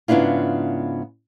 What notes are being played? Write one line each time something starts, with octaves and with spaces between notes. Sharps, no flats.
G#2 C#3 B3 D4 E4 F4